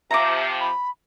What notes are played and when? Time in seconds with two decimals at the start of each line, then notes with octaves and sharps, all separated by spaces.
0.11 C3 F3 E5 A#5 D6
0.60 B5